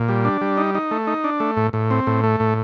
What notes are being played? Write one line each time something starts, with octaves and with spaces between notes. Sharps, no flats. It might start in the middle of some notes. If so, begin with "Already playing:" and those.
Already playing: A#2
G3
D4
G3
D#4
D#4
A3
D#4
D4
A3
A2
A2
C4
A2
A3
A2